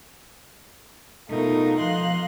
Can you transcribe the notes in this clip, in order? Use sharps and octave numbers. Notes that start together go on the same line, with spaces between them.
B2 A3 D#4 F4 A#4
F3 D#5 F5 C6 F#6